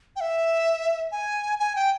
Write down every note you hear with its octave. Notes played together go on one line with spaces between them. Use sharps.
G5
E5
G#5
G#5
G5